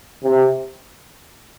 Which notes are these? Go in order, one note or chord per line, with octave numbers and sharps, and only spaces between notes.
C3